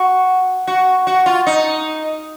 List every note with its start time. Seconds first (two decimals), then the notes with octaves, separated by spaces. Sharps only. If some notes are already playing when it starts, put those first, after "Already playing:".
Already playing: F#4
0.67 F#4
1.07 F#4
1.26 F4
1.47 D#4